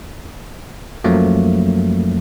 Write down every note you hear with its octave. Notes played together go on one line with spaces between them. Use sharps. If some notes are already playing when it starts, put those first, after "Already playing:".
F#2 F3 F#3 A3 A#3